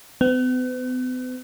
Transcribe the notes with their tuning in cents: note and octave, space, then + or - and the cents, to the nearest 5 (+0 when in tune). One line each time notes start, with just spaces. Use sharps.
B3 +45